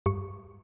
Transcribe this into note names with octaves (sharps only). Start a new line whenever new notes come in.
G2 C#6